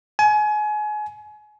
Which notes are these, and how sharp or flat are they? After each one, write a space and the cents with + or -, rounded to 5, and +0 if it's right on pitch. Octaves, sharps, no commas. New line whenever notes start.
G#5 +30